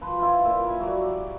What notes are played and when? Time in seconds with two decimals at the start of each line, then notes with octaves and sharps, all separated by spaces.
0.01 F3 B4 C5
0.19 E4 F4
0.45 A#2 E5
0.64 G#5 B5
0.80 F#3 G3 C#5 D5
1.05 D5